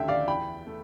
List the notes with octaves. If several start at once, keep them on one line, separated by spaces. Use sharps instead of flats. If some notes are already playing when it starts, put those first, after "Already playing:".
Already playing: D2 D3 A3 E5 G5
D5 F5
E2 G5 B5
A3